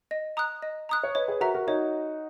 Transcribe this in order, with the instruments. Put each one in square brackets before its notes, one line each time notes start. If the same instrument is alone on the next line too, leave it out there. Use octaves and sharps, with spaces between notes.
[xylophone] D#5
A#5 D#6 F#6
D#5
A#5 D#6 F#6
[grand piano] C#5
[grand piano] B4 D#5 [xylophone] C#5
[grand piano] G#4 B4
[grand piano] F#4 A#4 [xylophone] E5 A#5
[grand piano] F#4 A#4
[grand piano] D#4 F#4 [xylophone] C#5